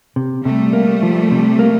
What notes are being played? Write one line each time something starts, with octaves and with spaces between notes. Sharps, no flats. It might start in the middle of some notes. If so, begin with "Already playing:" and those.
C3
C3 G3 A3
A#3
F3
C3
A#3